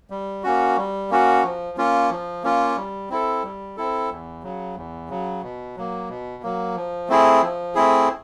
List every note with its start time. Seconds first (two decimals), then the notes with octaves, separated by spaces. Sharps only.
0.10 G3
0.44 A#3 C#4 F#4
0.77 G3
1.10 A#3 C#4 F#4
1.43 F3
1.77 A#3 C#4 F4
2.10 F3
2.44 A#3 C#4 F4
2.76 G3
3.10 C4 E4 A4
3.43 G3
3.77 C4 E4 A4
4.10 E2
4.43 C#3 F#3
4.76 E2
5.09 C#3 F#3
5.43 B2
5.76 F#3 A#3
6.09 B2
6.43 F#3 A#3
6.76 F3
7.09 A3 C4 E4 G#4
7.42 F3
7.75 A3 C4 E4 G#4